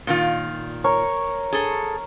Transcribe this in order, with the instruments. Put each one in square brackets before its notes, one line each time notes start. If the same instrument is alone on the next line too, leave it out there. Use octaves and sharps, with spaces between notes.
[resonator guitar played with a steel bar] A#2 D#3 F4
[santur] A#4 C#5
[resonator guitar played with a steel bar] G#4 A4